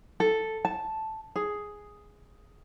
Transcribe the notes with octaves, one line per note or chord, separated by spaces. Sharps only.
A4
A5
G#4